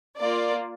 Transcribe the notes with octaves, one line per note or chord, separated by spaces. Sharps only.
A#3 F4 D5